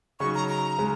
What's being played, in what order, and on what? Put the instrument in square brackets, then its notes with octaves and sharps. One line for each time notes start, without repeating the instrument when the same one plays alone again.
[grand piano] C#3 F#3 D#4 F#4 [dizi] C#6
[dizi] A#5
A#5
[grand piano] C#3 G#3 C#4